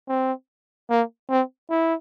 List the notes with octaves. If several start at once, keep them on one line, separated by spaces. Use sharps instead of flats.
C4
A#3
C4
E4